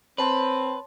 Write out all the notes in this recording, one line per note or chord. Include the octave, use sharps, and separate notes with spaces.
C4 B4 C#5 A5 C6